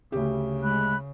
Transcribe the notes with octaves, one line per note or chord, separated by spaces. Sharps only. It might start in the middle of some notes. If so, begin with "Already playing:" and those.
D2 C#3 G4
G#3 B5 F#6